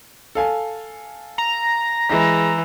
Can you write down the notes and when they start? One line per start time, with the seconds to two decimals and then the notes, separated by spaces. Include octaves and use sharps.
0.35 A4 F5 G#5
1.38 A#5
2.09 E3 G#3 A#6